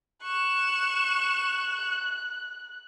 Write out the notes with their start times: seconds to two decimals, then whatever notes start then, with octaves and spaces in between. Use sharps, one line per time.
0.24 C#6 F#6 E7